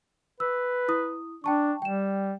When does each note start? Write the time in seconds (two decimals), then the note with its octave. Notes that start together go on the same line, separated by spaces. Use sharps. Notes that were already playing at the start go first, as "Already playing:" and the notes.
0.40 B4 E6
0.88 E4 D#6
1.44 D4 G5 A5 C#6
1.82 G3 G5 E7